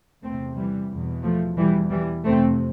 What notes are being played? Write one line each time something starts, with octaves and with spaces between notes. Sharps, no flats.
E2 C3 A3 C4
E3 G3
E2 B2
F3 A3
E2 B2 E3 G3
E3 G3
F2 C3 A3 C4